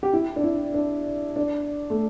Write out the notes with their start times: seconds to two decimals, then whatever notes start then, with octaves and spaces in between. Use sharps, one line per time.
0.03 G4
0.13 E4
0.36 D4
0.44 E4
0.74 D4
1.36 D4
1.90 A3